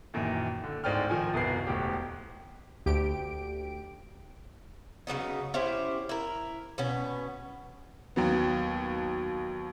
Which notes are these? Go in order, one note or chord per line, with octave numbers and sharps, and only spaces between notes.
F#2 A#2 D#3 E3
D3
D1 G#2 C5 D5 G5 F6
D#3 F3 G#5
C2 F#2 B2 A#4 B4 C7
E1 D2 G4
D2 G4 D7
C#3 F#3 B3 D#4
C#4 E4 G4 C5
E4 A#4
B2 B3 C#4
D#2 F#3 B3